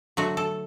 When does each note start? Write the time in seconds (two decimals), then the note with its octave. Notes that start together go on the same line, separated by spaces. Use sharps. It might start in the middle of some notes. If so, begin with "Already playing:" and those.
0.17 D3 F#3 A3 F#4
0.37 A4